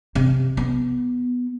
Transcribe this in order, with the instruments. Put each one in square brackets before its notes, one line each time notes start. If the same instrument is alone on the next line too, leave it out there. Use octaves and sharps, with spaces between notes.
[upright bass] C3
B3